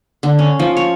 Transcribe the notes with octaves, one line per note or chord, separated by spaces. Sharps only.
D3
C#4
F3
C#5